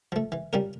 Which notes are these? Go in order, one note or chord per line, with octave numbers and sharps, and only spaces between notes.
F3 A3
E3
G3 C#4 F4 A#4